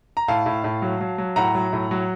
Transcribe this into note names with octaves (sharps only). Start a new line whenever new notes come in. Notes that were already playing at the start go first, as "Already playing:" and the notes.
A#5
A2 F5 A5
A2
A2
F#3
F#3
F#3
A2 F#5 A#5
F#3
A2
F#3